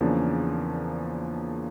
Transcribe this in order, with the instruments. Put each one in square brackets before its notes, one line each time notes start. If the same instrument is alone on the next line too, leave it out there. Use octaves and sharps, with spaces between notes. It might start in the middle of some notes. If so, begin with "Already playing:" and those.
[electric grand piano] E2 C#3 F3 A#3 D4